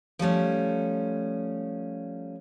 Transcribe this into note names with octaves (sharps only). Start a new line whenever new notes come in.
F3 G3 A3 C#4